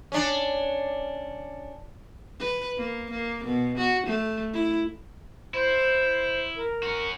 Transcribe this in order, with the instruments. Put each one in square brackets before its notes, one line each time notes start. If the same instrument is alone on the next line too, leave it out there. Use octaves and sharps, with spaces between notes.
[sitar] C#4 D4
[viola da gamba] B4
A#3
A#3
B2
F#4
A3
E4
[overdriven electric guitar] E4 [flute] C5
[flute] A#4
[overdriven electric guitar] C#4 F#4